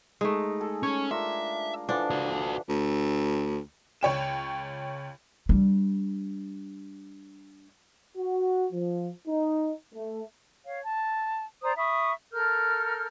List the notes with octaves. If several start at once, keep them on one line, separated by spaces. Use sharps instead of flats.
G#3 A3 D#4
G#4 A4
C#4 C#5
D4 F4 A#4 E5
D3 E3 F3 D4
F#4 A4
D2
C#2 C#5 G5 E7
G3 D4
F#4
F3
D#4
A3
C#5 F5
A5
C5 D5 A#5 D#6
E5 B5 C#6 D#6
A4 A#4 F6 G6